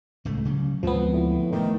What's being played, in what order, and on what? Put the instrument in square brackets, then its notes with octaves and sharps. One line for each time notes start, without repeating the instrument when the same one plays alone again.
[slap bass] D1 C#2 A3
C#3 F#3 G3
[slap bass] D2 G#3 C4 [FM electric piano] F3 B3
[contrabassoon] A2
[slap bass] G2 A3 [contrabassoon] D#3